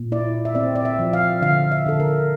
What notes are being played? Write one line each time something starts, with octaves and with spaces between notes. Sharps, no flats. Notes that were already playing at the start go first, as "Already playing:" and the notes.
Already playing: A#2
E4 D5
E5
C4 D5
D5
E5
F3
F5
D3 F5
E5
D3 A4
A#4